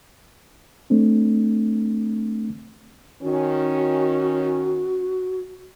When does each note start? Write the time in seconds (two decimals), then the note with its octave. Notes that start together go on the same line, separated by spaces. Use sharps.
0.90 A3 C4 D4
3.23 D#3 C#4 F#4